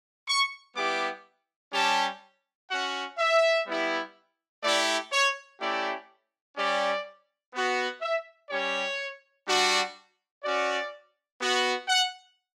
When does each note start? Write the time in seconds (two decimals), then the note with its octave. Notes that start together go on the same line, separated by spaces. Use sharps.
0.28 C#6
0.76 G3 B3 E4 G4 D6
1.73 G3 C#4 G4 A5
2.69 C#4 F#4 F#5
3.18 E5
3.66 G3 B3 E4 G4
4.63 A3 E4 G4 D5
5.12 C#5
5.60 A3 C#4 E4 G4 D5
6.57 G3 C#4 G4 D5
7.53 B3 F#4
8.02 E5
8.50 G3 C#4 G4 C#5
9.48 G3 D4 F#4
10.44 C#4 F#4 D5
11.41 B3 F#4
11.88 F#5